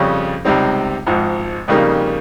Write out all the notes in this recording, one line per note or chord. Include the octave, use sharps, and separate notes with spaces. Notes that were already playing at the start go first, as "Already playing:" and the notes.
Already playing: F2 C#3 G3 C#4
C#2 C3 G3 C4 D#4
G#1 G#2 F3
F2 C#3 G3 A#3 D#4